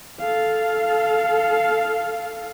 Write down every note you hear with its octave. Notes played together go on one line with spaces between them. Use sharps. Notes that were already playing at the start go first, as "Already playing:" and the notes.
A4 F5